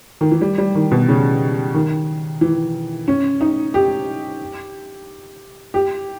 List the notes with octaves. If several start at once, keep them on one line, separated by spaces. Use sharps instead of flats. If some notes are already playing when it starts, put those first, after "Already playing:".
D#3
E3
G3
G3
D#3
B2
C#3
D#3
E3
C#4
D#4
G4
G4